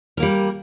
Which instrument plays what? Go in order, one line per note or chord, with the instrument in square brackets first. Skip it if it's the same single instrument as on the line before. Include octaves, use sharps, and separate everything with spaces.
[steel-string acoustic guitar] A#4
A#3
G3